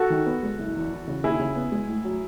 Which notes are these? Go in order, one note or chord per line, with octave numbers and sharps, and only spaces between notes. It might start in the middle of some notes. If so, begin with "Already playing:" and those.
Already playing: F#4 A4
D#3
B3
G#3
F#1
E2
E3
C#3
D#2 E4 G#4
C#3
B3
G#3
A2
F#3